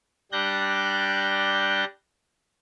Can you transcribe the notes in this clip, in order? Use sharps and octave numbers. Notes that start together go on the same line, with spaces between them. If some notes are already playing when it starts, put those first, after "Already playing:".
G3 D4 F#6 G6 A#6